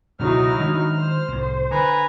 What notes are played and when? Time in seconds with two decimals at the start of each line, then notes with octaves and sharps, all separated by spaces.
0.19 C#2 B2 D3 F#3 D#4 E4 F6
0.60 D#3 G#3 D4
0.96 C5
1.28 C2 A2
1.71 D3 B4 G#5 A#5